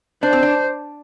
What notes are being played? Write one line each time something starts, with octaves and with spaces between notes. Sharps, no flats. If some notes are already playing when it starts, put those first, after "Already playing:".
D4 C5
C4
D4